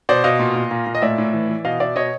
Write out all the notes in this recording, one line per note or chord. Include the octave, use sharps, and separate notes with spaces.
B2 C5 D5
B2 D#5 F5
A#2
A#2
A#2
A#2
D#5
A2 D5 E5
A2
E3
E3
B2 D#5 F5
B2 D5 E5
B2 C#5 D#5